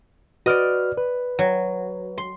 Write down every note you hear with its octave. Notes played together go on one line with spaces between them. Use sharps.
F#4 B4 D5 D#5 F6
B4
F#3
C6